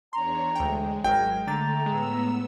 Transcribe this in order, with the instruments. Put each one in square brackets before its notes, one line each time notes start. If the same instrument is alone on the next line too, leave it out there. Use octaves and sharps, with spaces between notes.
[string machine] E2 D4 C#5 [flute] A#5 [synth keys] C6
[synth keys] D2 G5 [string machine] G#3
[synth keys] G#1 F#3 G#6 [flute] A#4 [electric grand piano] G5
[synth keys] D3 A6 [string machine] A3 [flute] A#5
[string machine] A2 B3 E6 [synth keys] G#3